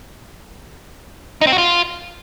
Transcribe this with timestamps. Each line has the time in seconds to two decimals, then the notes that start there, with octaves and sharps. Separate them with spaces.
1.41 D#4
1.47 C4
1.52 F#4
1.58 F4